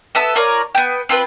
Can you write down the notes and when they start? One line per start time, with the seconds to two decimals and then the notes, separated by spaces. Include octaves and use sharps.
0.15 B3 A4 E5
0.35 F4 A#4 C#5 D5
0.75 B3 G5
1.09 C4 F4 B4